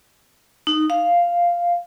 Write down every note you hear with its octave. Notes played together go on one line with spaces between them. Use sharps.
D#4
F5